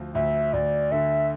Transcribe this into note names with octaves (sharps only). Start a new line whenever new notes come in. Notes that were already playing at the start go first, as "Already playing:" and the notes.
Already playing: D2 F3
D2 E5
D2 D5
D3 E5